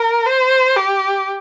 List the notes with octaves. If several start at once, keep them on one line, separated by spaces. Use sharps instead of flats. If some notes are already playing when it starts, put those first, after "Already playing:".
Already playing: A#4
C5
G4